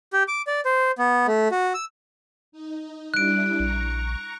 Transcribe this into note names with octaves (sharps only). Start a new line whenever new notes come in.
G4
D6
D5
C5
B3
A3
F#4
E6
D#4
G3 D4 E4 F#6 D7
A#1 A#5 C#6